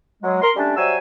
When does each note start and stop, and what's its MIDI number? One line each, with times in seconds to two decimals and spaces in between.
0.23 0.41 54
0.23 0.41 56
0.42 0.51 70
0.42 0.51 84
0.56 0.74 55
0.56 0.74 57
0.56 0.74 61
0.56 0.74 62
0.77 0.97 54
0.77 0.97 55
0.77 0.97 72
0.77 0.97 76
0.77 0.97 80
0.77 0.97 88